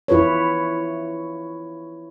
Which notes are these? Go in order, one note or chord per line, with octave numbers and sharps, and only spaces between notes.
E4 F4 B4 C#5